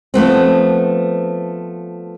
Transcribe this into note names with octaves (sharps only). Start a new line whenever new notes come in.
F3 A3 B3 C4